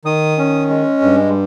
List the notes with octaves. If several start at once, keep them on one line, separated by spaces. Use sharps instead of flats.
D#3 D#6
C#4
G#3
G2